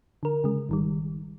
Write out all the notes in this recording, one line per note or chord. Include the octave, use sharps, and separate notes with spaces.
D3 A#4
C#3 G#3
G#1 D#3 G3